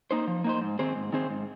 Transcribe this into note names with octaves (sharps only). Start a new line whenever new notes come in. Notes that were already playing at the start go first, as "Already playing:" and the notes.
A#3 D#4 C5
F3
A#3 D#4 C5
G#2
D#3 C4 G#4 C5
G#2
D#3 C4 G#4 C5
G#2